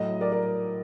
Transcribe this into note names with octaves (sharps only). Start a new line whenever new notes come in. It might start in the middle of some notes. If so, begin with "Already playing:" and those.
Already playing: A2 F#3 D#5
A#4 D5
A#4 D5